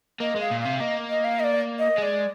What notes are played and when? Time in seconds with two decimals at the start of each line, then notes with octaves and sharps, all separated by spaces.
0.21 A#3 D#5
0.36 G#3 F5
0.51 A#2
0.61 C3 F5
0.80 A#3 D#5
1.10 D#5
1.24 F5
1.40 D#5
1.44 D5
1.79 D#5
1.98 G#3 D#5
2.02 D5